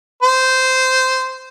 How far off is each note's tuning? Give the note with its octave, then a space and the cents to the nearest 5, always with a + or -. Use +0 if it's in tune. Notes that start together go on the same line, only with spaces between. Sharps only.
C5 -10